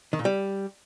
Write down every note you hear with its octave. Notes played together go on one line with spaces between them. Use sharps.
D#3
A#2
G3